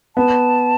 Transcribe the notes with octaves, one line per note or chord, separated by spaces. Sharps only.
B3 A5